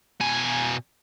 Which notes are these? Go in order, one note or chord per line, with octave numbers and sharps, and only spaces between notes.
B2 G#5